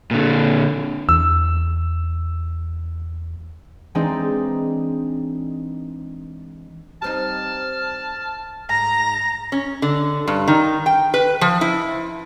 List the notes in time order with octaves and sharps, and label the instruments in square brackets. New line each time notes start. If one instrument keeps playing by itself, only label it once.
[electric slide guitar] A#2 D3
[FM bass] E2 [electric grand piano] E6
[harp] E3 G#3 C4 D4 D#4
[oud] G3 C4 D#4 [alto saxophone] A5 [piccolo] F6
[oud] G#2 [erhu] A#5 [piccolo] A#6
[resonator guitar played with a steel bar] C#4
D3
G2
D#3
G5
B4
F3
E4